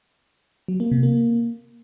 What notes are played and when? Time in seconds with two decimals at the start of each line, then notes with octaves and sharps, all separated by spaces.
0.68 F#3
0.80 A#3
0.91 C3
1.03 A#3